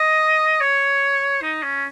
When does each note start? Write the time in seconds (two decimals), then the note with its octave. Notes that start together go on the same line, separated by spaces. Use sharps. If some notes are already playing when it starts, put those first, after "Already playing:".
Already playing: D#5
0.61 C#5
1.42 D#4
1.63 C#4